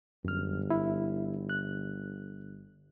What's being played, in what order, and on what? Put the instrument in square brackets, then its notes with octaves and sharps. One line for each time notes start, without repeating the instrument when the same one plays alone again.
[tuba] G1 [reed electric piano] F#2 F6
[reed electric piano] E4
F#6